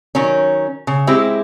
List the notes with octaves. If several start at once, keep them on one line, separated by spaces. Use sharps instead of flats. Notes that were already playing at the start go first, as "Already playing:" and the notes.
D#3 F#3 C#4
C#3
G#3 C4 E4 G4